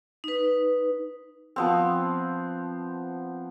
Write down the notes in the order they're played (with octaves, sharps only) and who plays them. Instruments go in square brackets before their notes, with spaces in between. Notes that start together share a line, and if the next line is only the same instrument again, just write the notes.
[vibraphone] D#4 B4
[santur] F3 B3 C4